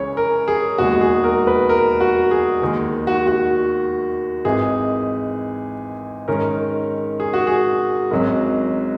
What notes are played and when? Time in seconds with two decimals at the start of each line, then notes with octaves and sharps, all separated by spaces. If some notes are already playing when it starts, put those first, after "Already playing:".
Already playing: C#2 C#3 E3 C#5
0.17 A#4
0.48 G#4
0.78 E1 D#2 D#3 G#3 F#4
1.01 G#4
1.24 A#4
1.47 B4
1.69 A#4
2.00 F#4
2.31 G#4
2.62 D#2 D#3 G#3
3.07 F#4
3.27 F#4
4.45 G#1 G#2 E3 G#4
6.28 G#2 D#3 G#3 C#4 A#4
7.20 G#4
7.33 F#4
7.47 G#4
8.11 G#1 G#2 F#3 C#4